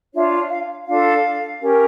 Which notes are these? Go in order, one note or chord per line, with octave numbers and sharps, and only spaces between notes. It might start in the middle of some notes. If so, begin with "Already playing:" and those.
D4 F4 C#5 E5
F5
D4 F4 A4 F5
C#4 G4 A#4